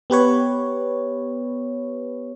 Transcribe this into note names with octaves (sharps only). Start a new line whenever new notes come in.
B3 G4 B4 C#5